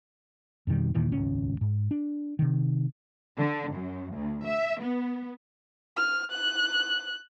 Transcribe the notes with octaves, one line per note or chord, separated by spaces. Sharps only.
F2 B2 D#3 G3
D#2 A#2 D#3 E3
D#1 G#1 C#2 C#4
G#2
D4
C3 D#3
D3
F#2
D2
E5
B3
F6
F#6